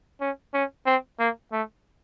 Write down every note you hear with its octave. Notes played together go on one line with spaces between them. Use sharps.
C#4
C#4
C4
A#3
A3